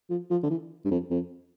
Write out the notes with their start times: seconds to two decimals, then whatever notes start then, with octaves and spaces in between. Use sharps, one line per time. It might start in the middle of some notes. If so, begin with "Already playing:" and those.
0.10 F3
0.31 F3
0.43 D3
0.50 E3
0.85 G2
0.91 F2
1.11 F2